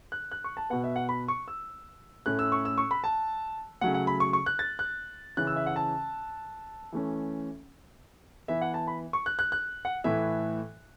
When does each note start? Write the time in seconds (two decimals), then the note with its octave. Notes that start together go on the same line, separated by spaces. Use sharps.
0.12 F#6
0.31 F#6
0.44 C#6
0.57 A5
0.70 B2 B3 F#5
0.84 E5
0.96 F#5
1.09 B5
1.28 C#6
1.48 E6
2.26 A2 A3 C#4 F#6
2.39 E6
2.52 C#6
2.65 E6
2.78 C#6
2.91 B5
3.04 A5
3.81 C#3 F#3 A3 F#5
3.94 F#5
4.07 B5
4.20 C#6
4.33 C#6
4.46 F#6
4.59 A6
4.79 F#6
5.37 C#3 E3 C#4 F#6
5.47 E6
5.56 E5
5.66 F#5
5.76 A5
6.92 E3 A3 C#4
8.48 E3 B3 E5
8.61 F#5
8.74 A5
8.87 B5
9.13 C#6
9.26 F#6
9.39 F#6
9.52 F#6
9.85 F#5
10.04 A2 E3 A3 E5